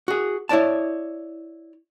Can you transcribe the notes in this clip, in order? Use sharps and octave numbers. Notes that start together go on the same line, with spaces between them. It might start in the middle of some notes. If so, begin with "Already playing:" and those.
F#4 G#4
E4 C#5 D5 A5